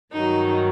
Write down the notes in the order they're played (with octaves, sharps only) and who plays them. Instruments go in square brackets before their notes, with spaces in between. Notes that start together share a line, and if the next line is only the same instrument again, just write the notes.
[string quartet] G2 D#3 F#3 D#4